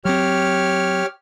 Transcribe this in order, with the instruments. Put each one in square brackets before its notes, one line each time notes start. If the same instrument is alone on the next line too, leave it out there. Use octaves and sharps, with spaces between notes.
[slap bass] F#3 C4 [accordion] G4 C#5 F6